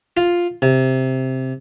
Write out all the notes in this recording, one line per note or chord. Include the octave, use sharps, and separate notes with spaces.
F4
C3